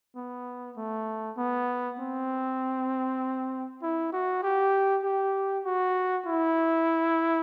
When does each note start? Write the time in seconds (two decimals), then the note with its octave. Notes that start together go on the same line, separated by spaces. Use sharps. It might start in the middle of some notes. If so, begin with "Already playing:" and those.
0.16 B3
0.77 A3
1.37 B3
1.99 C4
3.82 E4
4.12 F#4
4.43 G4
5.03 G4
5.64 F#4
6.26 E4